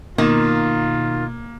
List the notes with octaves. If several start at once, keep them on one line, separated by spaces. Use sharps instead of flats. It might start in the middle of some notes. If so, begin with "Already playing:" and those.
B2 D#3 A#3 F4